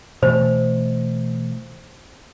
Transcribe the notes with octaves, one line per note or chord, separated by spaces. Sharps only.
B2 E3 A3 C5